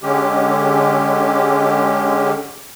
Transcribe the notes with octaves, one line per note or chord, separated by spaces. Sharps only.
D3 G#3 C#4 G4